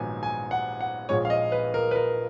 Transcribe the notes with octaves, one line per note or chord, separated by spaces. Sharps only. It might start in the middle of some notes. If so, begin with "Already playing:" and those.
Already playing: A#1 G#2 D#3 F#3 B3 G#5
G#5
F#5
F#5
A#1 A#2 G#3 C#5
F5
D#5
B4
A#4
B4
A#4